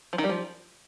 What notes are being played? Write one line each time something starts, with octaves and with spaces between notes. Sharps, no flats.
F3
D#3
G3
F3